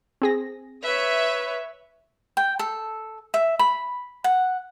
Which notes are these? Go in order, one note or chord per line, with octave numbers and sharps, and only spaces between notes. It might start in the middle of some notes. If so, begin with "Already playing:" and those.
C4 G#4 A#6
B4 C#5 E5
G5
A4
E5
B5
F#5